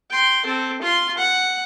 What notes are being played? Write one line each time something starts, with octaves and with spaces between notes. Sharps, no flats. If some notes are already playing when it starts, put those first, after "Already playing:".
G5 C6
C4 A4
F4 C6
F#5